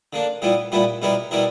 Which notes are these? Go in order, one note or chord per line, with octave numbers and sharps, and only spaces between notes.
D3 A#3 D4
A#2 G3 B3 E4
A#2 G3 B3 E4
B2 G3 B3 E4 A#4
B2 G3 B3 E4 A#4